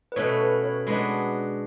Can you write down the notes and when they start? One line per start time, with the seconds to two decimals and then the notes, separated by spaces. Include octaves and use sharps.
0.12 B4
0.16 B2 A3 C#4 C#5
0.40 B4
0.63 C#5
0.87 G#3 B3 D4 F#4